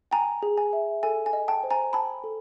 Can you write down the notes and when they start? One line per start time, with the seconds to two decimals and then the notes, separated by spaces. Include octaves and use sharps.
0.11 G5 G#5 A#5
0.43 G#4
0.58 G#5
0.73 E5
1.03 A4 G#5
1.26 G#5
1.33 D#5
1.48 G5 A5
1.63 C5
1.71 G#5 A#5
1.93 G5 A5 B5
2.24 A4